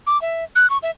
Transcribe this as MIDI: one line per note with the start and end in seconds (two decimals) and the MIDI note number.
0.07 0.20 86
0.22 0.44 76
0.56 0.69 90
0.70 0.78 85
0.83 0.91 76